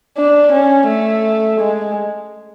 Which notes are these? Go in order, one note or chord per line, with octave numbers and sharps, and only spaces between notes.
D4
C#4
A3
G#3